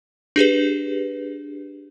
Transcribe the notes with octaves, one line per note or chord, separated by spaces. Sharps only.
D4 G4 G#4 B4